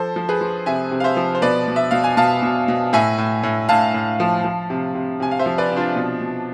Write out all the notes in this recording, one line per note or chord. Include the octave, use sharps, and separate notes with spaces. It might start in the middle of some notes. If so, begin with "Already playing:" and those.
Already playing: F3 A4 C5
F3
G#4 B4
F3
C3 E5 G#5
C3
F5
C5 E5
F3
C5
B2 B4 D5
B2
E5
B2 F5
G#5
B2 F5 A5
B2
B2
A2 E5 G#5
A2
A2
A2 F5 A5
A2
F3
F3
C3
C3
C3 G#5
F5
C5 E5
F3
B4 D5
C3
D4 F4
B2
B2